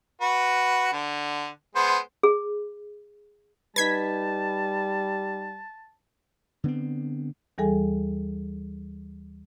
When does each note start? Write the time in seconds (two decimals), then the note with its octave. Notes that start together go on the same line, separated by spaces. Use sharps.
0.21 F#4 B4
0.93 D3
1.75 G#3 B3 C5
2.23 G#4
3.76 G3 D#4 B4 A5 G#6 B6
6.64 D3 B3 C4
7.58 D#2 E3 G3 G#4 A4 G#5